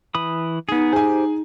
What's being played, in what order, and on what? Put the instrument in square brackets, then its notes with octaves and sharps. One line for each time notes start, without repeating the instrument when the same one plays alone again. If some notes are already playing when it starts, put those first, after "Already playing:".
[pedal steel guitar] E3 B5 D#6
[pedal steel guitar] B3 G#4 [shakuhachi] D#4
[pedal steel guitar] G4 C5 [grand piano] G#4 G#5